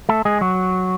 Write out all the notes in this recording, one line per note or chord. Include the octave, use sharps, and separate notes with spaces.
A3 A4
G#3 G#4
F#3 F#4